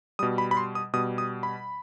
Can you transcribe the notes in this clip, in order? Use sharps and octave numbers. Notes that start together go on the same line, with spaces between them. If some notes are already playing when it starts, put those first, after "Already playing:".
B2 G3 D#6
B5
B5
C6
D#6
B2 G3 D#6
D#6
B5